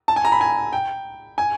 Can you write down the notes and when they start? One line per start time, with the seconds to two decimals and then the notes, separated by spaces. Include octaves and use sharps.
0.08 A5
0.16 G#5
0.25 A#5
0.32 B5
0.41 G#5
0.73 G5
1.38 G#5